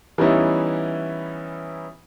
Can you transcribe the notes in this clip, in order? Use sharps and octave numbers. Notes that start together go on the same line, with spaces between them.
E3 G3 B3 C#4 D#4 E4